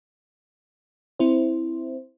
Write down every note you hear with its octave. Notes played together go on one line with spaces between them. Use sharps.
C4 E4 C5